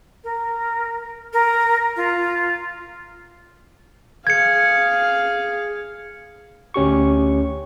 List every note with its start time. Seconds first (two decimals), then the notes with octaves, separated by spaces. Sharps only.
0.24 A#4
1.33 A#4
1.96 F4
4.27 G#4 F5 G#6 C#7
6.74 D2 C#4 G4 C#6